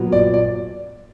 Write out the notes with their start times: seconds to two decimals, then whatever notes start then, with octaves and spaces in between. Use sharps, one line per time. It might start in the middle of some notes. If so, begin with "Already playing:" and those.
Already playing: A#2 F#3 B3
0.12 D5
0.34 D5